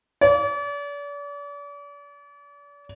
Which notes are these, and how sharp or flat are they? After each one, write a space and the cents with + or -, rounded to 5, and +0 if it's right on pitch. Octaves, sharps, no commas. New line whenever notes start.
D5 -40